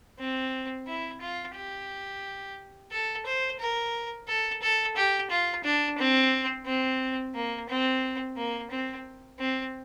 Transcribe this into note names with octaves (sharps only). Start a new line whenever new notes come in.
C4
E4
F4
G4
A4
C5
A#4
A4
A4
G4
F4
D4
C4
C4
A#3
C4
A#3
C4
C4